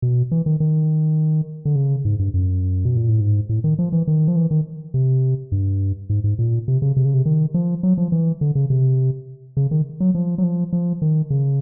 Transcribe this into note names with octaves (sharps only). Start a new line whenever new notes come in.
B2
E3
D#3
D#3
D3
C#3
G#2
G2
F#2
B2
A#2
A2
G#2
A2
D#3
F3
E3
D#3
F3
E3
D#3
C3
G2
G#2
G#2
A#2
C3
C#3
C3
C#3
C3
D#3
F3
F#3
F3
E3
D3
C#3
C3
C#3
D#3
F#3
F3
F#3
F3
F3
D#3
C#3